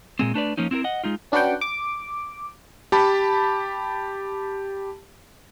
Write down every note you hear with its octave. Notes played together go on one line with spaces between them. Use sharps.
A#2 G#3 C4
A3 D4 B4 D5
F3 A#3 C#4 D#4
C4 E4 F4 A#4
D#5 F#5
G#3 D#4 F4
C#4 D4 F#4 B4 F#5 G5
D6
G4 A5 B5